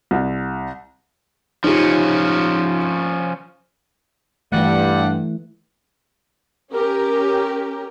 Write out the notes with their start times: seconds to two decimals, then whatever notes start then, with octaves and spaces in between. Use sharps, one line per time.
0.11 C2
1.64 F3 C#4 D#4 F4 G4
4.52 G2 E3 G3 A3 F#5
6.73 C#4 G4 A#4